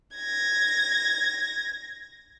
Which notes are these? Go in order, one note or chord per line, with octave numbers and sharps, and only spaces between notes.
G#6 A#6